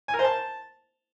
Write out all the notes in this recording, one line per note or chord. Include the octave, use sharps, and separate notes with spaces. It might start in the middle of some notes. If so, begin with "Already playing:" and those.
G#5
A#4
C5
A5